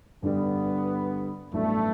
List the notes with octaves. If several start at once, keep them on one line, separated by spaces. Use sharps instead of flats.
G2 D3 G3 B3 D4
A1 G2 F#3 A3 B3 D4